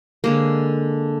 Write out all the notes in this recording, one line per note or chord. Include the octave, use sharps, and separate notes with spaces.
D3 G#3 A#3